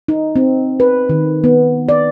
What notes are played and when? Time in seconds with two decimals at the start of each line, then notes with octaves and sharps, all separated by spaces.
0.08 D#4
0.36 C4
0.80 B4
1.09 D#3
1.44 B3
1.89 D5